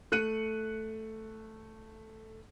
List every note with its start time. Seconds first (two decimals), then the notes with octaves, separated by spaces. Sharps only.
0.12 A3 F#6 C#7 D#7